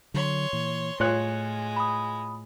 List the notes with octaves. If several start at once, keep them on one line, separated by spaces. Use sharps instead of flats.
D3 F#3 C#5 C6
A#2 E3
A2 G#3 F4 C#5 F#6
B5 D#6